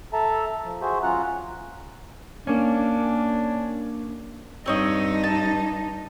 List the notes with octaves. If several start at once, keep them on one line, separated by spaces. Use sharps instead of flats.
A4 E5 A5 A#5
F3
F#4 G#4 C5 E5
F#3 C#4 F4 F#5 A#5 F#6
A#3 C#4 D4
G2 C4 D#4 C#5 D#5
A5